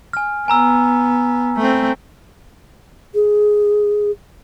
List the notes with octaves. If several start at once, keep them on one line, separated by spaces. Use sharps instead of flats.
G#5 F6
B3 G#5 A#5 E6
A3 C4
G#4